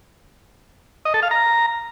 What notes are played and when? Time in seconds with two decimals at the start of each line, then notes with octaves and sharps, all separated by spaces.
1.05 D#5
1.14 A4
1.23 F5
1.31 A#5